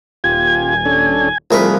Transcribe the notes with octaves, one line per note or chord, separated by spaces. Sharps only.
D#1 F4 G4 G#5 G#6
C#4 D4 A4
C2 F3 A3 F4 G#4 A#4 B4